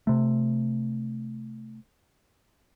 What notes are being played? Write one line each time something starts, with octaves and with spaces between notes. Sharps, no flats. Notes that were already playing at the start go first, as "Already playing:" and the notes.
C3 A3